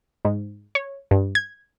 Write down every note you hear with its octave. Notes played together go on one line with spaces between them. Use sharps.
G#2
C#5
G2
G#6